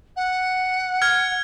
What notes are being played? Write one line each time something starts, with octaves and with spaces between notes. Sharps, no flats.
F#5
F6 G#6